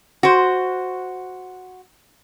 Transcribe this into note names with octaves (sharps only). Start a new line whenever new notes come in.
F#4 C5